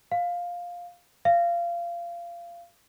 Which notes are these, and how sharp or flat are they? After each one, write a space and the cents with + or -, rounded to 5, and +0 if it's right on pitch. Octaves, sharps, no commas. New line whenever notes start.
F5 +10
F5 -20